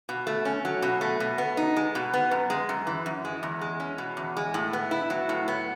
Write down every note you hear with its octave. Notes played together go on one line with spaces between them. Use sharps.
B2
A3
C#4
F#3
B2
A3
B2
B3
D#4
G#3
B2
B3
F#2
G#3
F#2
E3
F#2
G#3
E2
G#3
C#4
B2
E2
G#3
A2
B3
E4
F#3
A2
B3